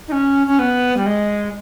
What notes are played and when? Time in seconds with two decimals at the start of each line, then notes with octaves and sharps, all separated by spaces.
0.08 D#4
0.12 C#4
0.47 C#4
0.59 B3
0.97 G3
1.06 G#3